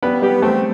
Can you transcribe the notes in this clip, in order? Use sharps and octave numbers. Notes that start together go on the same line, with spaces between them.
G3 B3 B4
G3 B3 G4
A3 C4 A4